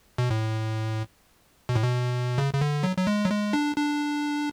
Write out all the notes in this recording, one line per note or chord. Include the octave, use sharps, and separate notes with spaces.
B2
A2
B2
A2
B2
C#3
C#3
D3
F#3
F#3
G#3
F#3
G#3
D4
D4